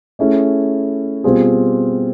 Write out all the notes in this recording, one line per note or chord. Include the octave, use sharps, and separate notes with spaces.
A3 C#4 E4 G#4
B2 G3 C4 F4 G#4